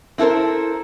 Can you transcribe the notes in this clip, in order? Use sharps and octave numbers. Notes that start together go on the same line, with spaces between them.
C4 E4 A4 A#4 C5